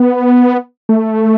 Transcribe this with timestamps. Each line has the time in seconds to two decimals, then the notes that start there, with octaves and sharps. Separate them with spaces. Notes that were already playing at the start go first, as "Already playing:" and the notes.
Already playing: B3
0.89 A3